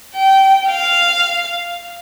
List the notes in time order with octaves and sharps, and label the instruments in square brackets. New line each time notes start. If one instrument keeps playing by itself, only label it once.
[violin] G5
F5